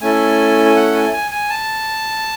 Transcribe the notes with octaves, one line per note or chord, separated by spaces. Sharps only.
A3 C#4 E4 A4 G#5
G#5
F#5
G#5
G#5
G#5
A5